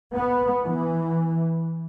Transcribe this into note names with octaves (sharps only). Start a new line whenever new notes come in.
B3
E3